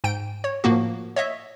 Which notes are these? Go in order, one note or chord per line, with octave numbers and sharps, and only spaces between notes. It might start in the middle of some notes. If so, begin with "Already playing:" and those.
G#2 G5 D7
C#5
A2 F3 A#3 F#4
C#5 D#5 E5